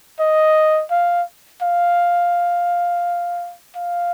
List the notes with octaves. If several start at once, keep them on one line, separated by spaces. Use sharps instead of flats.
D#5
F5
F5
F5